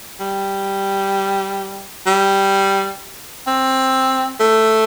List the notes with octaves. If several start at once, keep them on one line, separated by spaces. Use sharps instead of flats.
G3
G3
C4
A3